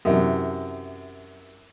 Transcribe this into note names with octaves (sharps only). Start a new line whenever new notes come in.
F#2 C3 E3